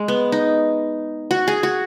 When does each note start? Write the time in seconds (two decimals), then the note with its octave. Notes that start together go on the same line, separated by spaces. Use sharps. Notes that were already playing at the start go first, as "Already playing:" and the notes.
Already playing: G#3
0.08 B3
0.32 D#4
1.31 F#4
1.48 G#4
1.63 F#4